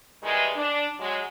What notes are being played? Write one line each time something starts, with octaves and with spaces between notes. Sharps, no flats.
D#3 E3 G3 G#3
D4
F#3 G#3